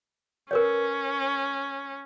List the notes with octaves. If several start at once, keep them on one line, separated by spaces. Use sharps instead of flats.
C#4 A#4 B4 C#5